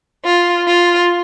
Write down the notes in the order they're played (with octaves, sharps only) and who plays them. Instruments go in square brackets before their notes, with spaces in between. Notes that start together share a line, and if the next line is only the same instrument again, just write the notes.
[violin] F4
F4